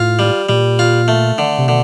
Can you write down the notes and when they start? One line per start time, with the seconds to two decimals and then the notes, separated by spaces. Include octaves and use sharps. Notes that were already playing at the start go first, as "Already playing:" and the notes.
Already playing: A2 F4
0.19 G3
0.49 A#2 G3
0.79 F4
1.08 A3
1.38 D3
1.58 C3
1.68 B2 D3